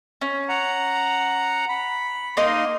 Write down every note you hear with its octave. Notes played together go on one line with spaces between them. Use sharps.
C#4
F#5 A#5
B5
A#3 D#4 D#5 C6